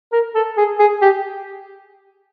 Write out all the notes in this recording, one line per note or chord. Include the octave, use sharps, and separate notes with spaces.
A#4
A4
G#4
G#4
G4